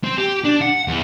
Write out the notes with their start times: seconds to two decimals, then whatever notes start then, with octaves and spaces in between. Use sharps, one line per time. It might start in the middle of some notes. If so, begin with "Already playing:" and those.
0.04 C4
0.18 G4
0.45 D4
0.62 F#5
0.88 E2